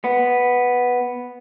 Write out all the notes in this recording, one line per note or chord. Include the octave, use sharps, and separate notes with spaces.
B3